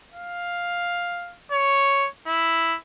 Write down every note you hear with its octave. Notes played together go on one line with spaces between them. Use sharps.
F5
C#5
E4